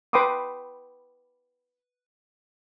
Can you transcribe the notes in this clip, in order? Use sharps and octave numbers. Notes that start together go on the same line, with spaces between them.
B4 G5 B5 C6 D6 D#6